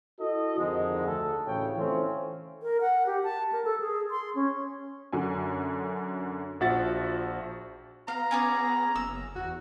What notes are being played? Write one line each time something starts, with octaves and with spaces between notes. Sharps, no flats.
E4 F#4 A4 D#5
F2 G#2 D3 D#3 G#3
D2 A4
A1 D2 C#3 C#5 G5
E3 A3 C4 C#4 F4
A#4
F#5
G4
A5
A#4
A4
G#4
C6
C#4
F#2 D3 F#4 G#5
A#1 F3 F#4 E5 F#5 A6
B3 F5 A#5
C#4 G#4 D5
F#1 E6
E2 F#4